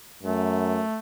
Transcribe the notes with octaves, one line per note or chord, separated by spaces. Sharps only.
F#2 A3